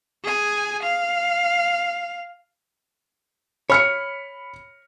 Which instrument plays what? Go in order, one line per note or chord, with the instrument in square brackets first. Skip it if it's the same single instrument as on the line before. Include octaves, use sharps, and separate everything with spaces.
[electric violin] G#4 G#5
F5
[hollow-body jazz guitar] C#5 [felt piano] B5 F6 C#7